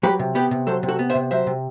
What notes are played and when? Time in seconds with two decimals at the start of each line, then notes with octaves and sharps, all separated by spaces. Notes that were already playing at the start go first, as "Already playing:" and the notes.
0.03 F#3 G4 B4
0.19 C3
0.35 B3 G4 B4
0.51 C3
0.67 F#3 A4 C5
0.83 C3
0.88 F#4 A4
0.99 B3
1.10 C5 E5
1.15 C3
1.31 F#3 C5 E5
1.47 C3